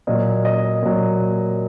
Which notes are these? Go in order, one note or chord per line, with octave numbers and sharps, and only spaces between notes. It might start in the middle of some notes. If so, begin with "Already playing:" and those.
A#2 F#3 D#5
D#5
A#2 F#3